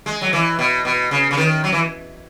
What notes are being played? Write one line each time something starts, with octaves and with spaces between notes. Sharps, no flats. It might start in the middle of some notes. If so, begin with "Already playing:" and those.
G#3
F#3
E3
B2
B2
C#3
C#3
D#3
F#3
E3